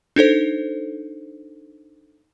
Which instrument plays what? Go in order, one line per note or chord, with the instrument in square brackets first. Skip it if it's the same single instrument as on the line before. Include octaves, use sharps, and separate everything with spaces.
[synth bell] D4 D#4 A4 C5